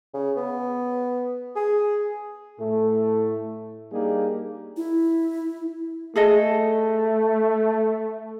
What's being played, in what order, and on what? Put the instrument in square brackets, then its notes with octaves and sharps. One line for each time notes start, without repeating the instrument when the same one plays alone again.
[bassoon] C#3
B3
G#4
[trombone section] A2 A3
G3 A#3 D4 D#4 G4 G#4
[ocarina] E4
[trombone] A3 [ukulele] G#4 A4 D#5